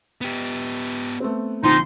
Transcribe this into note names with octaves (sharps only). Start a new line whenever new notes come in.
B3 G4
A3 B3 C4
A#1 D3 F3 C4 D#4 C6